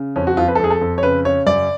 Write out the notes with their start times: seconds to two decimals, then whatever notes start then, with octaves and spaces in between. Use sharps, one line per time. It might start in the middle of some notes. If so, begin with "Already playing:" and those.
Already playing: C#3
0.16 F2 C#4
0.27 F#4
0.37 F2 F4
0.48 B4
0.55 A4
0.59 F2 G#4
0.70 A4
0.81 F2
0.98 C#5
1.03 C#3 B4
1.25 C#3 C#5
1.46 F#2 D5